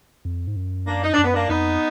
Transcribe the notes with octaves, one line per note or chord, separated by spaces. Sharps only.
F2
G#2
F#2
A#3 D4
D#4
F#2 D4
B3
A#3 D4
F2 B3 D#4